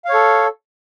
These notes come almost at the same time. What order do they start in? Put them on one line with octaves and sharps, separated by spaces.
F5 C#5 A4